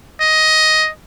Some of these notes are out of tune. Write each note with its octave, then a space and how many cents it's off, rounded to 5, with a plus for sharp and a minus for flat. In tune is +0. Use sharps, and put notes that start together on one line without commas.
D#5 +10